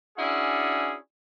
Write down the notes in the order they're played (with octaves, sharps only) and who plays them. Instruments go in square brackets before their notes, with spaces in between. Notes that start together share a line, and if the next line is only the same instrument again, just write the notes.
[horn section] C#4 D4 E4 F#4 G#4